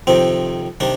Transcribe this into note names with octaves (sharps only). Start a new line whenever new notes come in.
F2 C3 D#3 C4
C3 D#3 D4